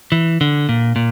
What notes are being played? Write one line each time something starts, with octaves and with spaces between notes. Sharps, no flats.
E3
D3
A#2
A#2